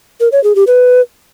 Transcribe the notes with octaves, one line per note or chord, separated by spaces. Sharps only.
A#4
C#5
G#4
G4
B4